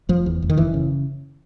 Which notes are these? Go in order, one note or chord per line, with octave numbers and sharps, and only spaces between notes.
F1 F3
E2
F1
D#3
F#1 E3
C#3